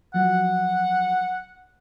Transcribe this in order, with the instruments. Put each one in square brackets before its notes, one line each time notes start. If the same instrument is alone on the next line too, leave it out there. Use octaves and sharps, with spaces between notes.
[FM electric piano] F3 F#3 [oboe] F#5